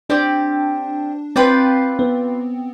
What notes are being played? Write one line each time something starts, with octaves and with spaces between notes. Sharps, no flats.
C4 D4 G4 D5
C4 F4 B4 D5 G5
B3